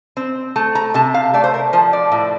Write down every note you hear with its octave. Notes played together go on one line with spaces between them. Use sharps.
C4
A3 A5
A#5
C3 A5
F5
A3 D5
C5
A#4
F3 C5
D5
A2